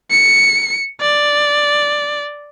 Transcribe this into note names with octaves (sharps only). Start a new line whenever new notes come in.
C#7
D5